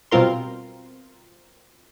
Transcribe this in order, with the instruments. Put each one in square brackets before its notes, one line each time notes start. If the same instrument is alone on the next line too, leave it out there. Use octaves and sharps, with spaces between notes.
[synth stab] B2 G3 C4 F4 A#4 C6